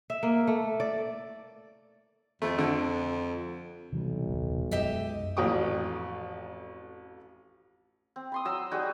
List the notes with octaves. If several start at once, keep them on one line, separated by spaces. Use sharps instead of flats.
E5
A#3
A3
D5
F2 A3
D3
B1 C3 E3 G3
D#1 C2
F#2 G#3 G4 D#5 E5
A1 F2 F#3 G5 C#6 D#6
C4
B5 C6 D#6
F#3 A#5 E6
G3 D#4 F#4 G#4